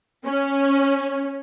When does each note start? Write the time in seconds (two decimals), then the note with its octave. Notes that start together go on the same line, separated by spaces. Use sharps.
0.25 C#4